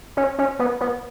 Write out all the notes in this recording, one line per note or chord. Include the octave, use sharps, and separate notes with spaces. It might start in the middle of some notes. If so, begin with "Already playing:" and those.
C#4
C#4
B3
B3